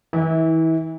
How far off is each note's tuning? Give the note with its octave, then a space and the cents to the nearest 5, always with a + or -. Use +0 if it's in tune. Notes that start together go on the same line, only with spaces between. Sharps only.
E3 -30 E4 -35